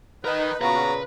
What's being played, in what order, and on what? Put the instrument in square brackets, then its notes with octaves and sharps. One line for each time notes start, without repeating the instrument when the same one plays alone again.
[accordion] D#4 [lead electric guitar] A#4 D#5 [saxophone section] B4
[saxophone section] A#2 C#3 [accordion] B3 F#4 [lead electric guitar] B4 [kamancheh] A#5